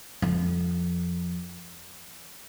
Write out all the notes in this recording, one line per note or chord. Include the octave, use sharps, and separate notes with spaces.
F2